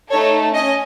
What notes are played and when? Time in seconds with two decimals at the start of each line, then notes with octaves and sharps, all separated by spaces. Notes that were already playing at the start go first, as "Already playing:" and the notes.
0.10 A3 D#4 A4 C#5
0.54 C#4 D#5